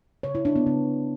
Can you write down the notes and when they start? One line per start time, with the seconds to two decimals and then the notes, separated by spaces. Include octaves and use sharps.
0.23 C#3 C#5
0.35 E4
0.45 G3 A#3 D4
0.56 B3
0.66 C#3 B3